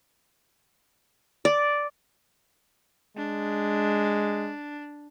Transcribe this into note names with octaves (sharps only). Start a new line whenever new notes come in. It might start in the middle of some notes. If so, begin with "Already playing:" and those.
D5
G#3 D4